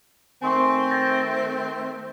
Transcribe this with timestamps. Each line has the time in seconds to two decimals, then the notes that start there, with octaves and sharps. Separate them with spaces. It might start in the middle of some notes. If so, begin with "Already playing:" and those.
0.42 D#3 A3 C4 G#5 C6 C#6
0.91 G6 A6 A#6